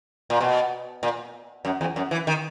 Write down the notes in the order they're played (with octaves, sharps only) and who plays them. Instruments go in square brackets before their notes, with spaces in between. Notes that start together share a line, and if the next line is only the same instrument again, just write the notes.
[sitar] A#2
B2
A#2
F#2
E2
F#2
E3
D#3